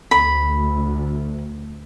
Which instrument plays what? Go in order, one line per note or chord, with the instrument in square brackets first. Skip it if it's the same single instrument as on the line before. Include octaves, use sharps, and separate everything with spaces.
[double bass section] D2 [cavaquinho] B5